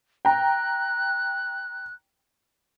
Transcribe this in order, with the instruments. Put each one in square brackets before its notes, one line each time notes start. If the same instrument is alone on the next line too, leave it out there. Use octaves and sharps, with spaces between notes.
[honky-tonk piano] G5 A#5 [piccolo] F#6